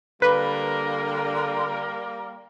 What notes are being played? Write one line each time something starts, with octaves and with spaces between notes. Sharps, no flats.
D3 G3 A#3 A#4 B4